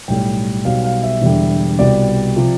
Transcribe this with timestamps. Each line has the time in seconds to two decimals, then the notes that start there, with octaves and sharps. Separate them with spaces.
0.08 B1 A2 G3 G5
0.65 B1 B2 G3 F5
0.84 F5
1.03 E5
1.22 E1 E2 D3 G3
1.79 C2 B2 G3 D5
2.36 C3 F3